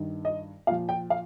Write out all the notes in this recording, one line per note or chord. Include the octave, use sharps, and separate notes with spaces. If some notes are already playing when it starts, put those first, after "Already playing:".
Already playing: G2 D#3
D#5
A#2 F3 F5
G5
F5